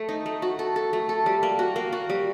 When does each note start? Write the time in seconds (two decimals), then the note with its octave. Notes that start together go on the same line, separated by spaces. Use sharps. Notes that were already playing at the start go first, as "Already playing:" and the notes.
Already playing: A3
0.09 D#4
0.26 A3
0.42 F#4
0.59 A4
0.76 A4
0.93 A3
1.09 A4
1.26 G3
1.43 A#3
1.59 F#4
1.76 A#3
1.92 F#4
2.10 G3